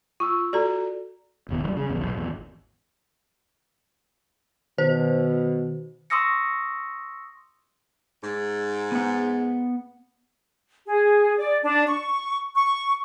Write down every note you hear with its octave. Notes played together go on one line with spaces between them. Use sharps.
F4 C#6 E6
F#4 A4 D5 A#5
F#1 D#2 B2
E3 G3
C#3
F1 A#1 E2
B1
G#1 E2
B2 D#3 C5
C6 C#6 D#6 E6 A#6 C#7
G#2
B3 F#5
G#4
D5
D4
C#6
C#6